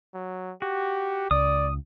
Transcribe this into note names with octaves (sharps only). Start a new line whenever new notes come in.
F#3
F#4 G4
C#2 D5 D#6